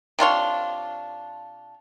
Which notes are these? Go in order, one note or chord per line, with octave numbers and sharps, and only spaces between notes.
C3 D4 F4 C#5